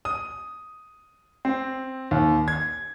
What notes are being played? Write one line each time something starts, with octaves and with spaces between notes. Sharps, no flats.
D#6
C4
D#2
G#6